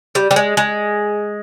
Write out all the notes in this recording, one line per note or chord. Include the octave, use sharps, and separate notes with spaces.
G3
G3
G#3
G#3